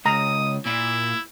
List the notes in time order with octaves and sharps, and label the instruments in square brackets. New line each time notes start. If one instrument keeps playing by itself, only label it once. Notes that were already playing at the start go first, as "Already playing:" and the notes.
[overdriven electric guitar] C#2 [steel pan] A#5 [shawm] D#6
[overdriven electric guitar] A#2 [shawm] E4